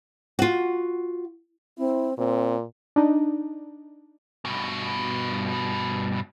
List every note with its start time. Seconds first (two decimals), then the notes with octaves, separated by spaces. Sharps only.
0.39 F4 F#4
1.78 C4 E4
2.18 A#2 C4
2.96 D4 D#4
4.45 G2 B2